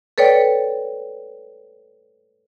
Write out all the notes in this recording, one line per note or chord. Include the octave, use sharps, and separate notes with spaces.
A4 B4 C#5 D5 G5